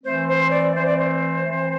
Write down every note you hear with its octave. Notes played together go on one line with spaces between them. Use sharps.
E3 A3 C4 C5
C5
D5
E3 A3 C4 C5
D5
C5
E3 A3 C4